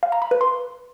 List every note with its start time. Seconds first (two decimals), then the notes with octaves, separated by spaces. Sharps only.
0.03 F5
0.12 A#5
0.22 B5
0.31 B4
0.41 C6